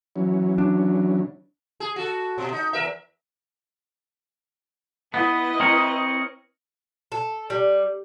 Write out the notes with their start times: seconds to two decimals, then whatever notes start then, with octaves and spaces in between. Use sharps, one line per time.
0.16 E3 F#3 C#4
0.58 D4
1.80 G#4
1.96 F#4 A4
2.38 B2
2.53 D#4
2.73 E2 A#4 E5
5.14 B3 E4 B4 D#5
5.60 C4 A#4 C#5
7.12 A4
7.50 G3